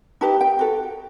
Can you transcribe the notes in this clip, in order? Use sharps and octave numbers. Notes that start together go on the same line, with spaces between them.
D#4 G4 B4 A5
G5
F#4 A4